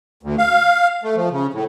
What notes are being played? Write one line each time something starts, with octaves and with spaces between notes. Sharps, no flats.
D2
F5
A3
F3
C#3
A2